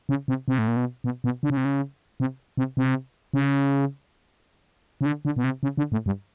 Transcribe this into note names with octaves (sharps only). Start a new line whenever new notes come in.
C#3
C3
C3
A2
A#2
B2
B2
B2
D3
C#3
C3
C#3
C3
C3
C3
C#3
C#3
D3
D3
B2
C3
C#3
D3
A2
G2